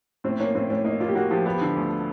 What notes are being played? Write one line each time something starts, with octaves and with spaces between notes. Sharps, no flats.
A2 C4
A#3 C#4
A2 C4
A2 C#4
A#3 D#4
A#3 F4
G4
A#3 F#4
F3 G4
B3 G4
D3
D2